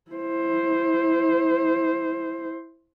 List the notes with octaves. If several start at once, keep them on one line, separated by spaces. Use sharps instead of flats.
E4 C5